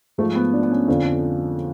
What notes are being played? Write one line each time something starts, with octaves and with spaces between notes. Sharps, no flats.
G#2 F3 A3
B3
D4
B3
C#4
F2 D3 F3